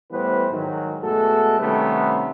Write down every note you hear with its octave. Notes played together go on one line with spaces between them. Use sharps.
A2 E3 G3 B3 B4 C5
G#2 D#3 F#3
B2 G#3 A3 F#4 A4
C3 D#3 G3 A3 B3 C#4